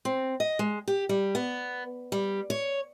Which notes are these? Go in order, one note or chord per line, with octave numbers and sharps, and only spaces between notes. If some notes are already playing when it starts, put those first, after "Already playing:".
C4
D#5
G#3
G4
G3
B3
G3
C#5